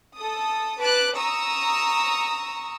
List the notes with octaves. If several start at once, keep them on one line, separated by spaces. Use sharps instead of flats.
A4 D#6
B4 A5 D6 F#6
A#5 C#6 D#6 E6